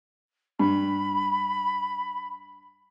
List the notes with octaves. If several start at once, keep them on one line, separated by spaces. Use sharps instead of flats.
G2 B5